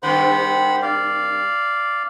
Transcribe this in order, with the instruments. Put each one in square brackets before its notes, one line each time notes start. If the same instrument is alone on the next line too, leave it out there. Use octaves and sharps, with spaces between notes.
[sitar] G2 C3 D#3 [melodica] C5 F#5 B5
[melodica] D5 F5